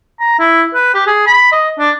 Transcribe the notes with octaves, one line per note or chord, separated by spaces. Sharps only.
A#5
E4
B4
G4
G#4
B5
D#5
D4